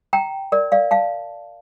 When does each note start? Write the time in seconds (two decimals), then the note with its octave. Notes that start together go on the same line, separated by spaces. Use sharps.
0.13 G5 A#5
0.52 A#4 D5
0.72 D5 F5
0.91 F5 A5